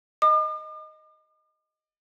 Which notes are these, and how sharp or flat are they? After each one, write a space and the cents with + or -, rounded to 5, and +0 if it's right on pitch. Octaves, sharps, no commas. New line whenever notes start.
D#5 +0 D6 +45